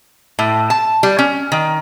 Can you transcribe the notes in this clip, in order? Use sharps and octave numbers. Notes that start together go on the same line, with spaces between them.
A2
A5
G3
C#4
D#3